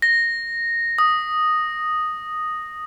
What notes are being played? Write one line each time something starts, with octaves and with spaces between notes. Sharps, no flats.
A#6
D#6